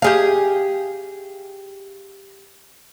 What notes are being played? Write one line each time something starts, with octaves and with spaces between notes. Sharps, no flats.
G4 G#4 F5